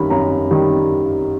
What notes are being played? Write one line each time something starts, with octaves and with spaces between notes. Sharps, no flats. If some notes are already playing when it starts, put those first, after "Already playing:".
Already playing: F#2 D#3 G3 B5
F#2 A#5
D#3 G3